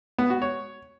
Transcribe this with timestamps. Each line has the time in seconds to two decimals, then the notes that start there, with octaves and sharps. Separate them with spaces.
0.18 B3
0.30 F#4
0.42 C#5